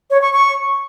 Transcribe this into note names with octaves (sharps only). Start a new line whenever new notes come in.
C#5
C#6
C#6